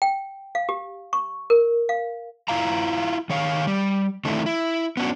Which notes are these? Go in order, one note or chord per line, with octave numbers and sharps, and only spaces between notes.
G5
F5
G4
C#6
A#4
F5
E4 F4 F5 A#5
D#3 C#5 F5
G3
D#3 A3 C4 D4 E4
E4
B3 C#4 D4 F#4